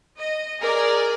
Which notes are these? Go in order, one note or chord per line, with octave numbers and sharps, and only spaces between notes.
D#5
G#4 A#4 D5